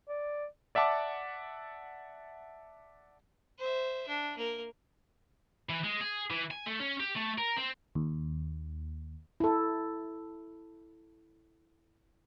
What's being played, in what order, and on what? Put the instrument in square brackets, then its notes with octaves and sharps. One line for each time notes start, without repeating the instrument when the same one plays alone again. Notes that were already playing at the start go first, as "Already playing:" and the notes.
[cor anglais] D5
[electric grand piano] D5 E5 F#5 A5 D6
[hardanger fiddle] C5 E5
D4
A#3 A#4
[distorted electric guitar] E3
G#3
G#4
E3
G#5
A3
C#4
G4
A3
A#4
C4
[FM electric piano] D#2
[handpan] E4 A4